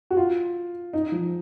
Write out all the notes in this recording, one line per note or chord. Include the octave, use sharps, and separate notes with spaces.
F#4
F4
D#4
F3